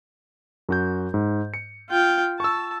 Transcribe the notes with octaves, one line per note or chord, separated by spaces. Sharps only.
F#2 F#4 G6
G#2
C#7
F4 G5
A5 C#6 E6